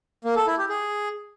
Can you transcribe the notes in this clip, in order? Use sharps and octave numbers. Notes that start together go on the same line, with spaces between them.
A#3
A4
E4
G4
G#4